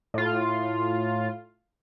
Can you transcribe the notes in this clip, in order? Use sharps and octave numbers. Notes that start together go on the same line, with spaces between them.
A2 F4